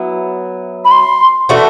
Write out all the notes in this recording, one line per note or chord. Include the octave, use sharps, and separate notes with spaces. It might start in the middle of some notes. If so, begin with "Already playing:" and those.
Already playing: F#3 B3 E4
B5
C6
E3 A3 D4 F#4